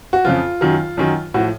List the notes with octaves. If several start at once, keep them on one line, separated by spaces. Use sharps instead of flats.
F#4
F2 C#3 F3 F4
F#2 D#3 F#3
F#2 D#3 F#3
A2 F3 F#4